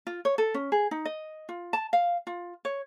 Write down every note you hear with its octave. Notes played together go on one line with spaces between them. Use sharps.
F4
C#5
A4
C#4
G#4
D#4
D#5
F4
A5
F5
F4
C#5